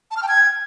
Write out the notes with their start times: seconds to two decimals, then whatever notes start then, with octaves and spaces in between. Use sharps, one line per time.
0.11 A5
0.17 F6
0.23 G5
0.28 G#6